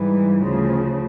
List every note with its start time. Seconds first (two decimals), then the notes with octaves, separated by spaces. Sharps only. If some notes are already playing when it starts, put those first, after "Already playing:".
Already playing: G#2 E3 G3
0.43 D2 C#3 F3